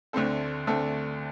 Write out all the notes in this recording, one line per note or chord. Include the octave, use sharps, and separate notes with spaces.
D2 D3 A3 C4 A4
D2 D3 A3 C4 A4